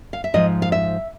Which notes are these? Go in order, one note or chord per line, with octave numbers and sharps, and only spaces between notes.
F5
E5
G#2 F3 D#5
F5
E5